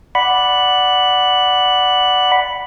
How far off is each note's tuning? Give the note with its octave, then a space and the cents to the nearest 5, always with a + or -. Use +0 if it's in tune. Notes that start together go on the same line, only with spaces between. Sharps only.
D5 +0 F#5 +0 B5 +0